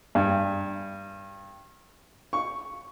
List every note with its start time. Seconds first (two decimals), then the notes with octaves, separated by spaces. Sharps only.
0.15 G2
2.33 C#6